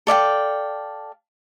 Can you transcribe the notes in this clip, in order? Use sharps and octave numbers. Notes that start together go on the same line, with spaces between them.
A4 D5 F5 G5